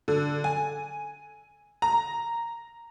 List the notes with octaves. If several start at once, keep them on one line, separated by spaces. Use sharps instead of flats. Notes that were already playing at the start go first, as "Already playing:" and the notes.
D3
G#5
A#5